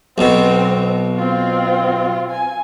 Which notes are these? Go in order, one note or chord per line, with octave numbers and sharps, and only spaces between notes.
B1 B2 C4
C4 F4
G#5